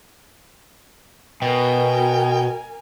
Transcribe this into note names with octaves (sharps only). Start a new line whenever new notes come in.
B2 A#4 G5 G#5